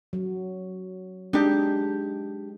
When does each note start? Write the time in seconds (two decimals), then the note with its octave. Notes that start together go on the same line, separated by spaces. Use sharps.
0.13 F#3
1.33 G#3 D4 D#4 G4